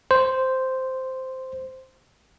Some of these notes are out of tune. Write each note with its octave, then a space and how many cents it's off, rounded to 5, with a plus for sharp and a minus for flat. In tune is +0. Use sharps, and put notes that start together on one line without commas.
C5 -5